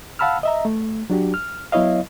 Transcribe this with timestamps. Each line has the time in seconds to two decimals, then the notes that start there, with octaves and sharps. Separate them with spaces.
0.19 F5 F#5 A5 B5 E6 F6
0.43 D#5 E5 A#5
0.65 A3
1.10 F#3 D4 F#4 G4
1.34 F6
1.72 F#3 B3 E4 C#5 D#5 F5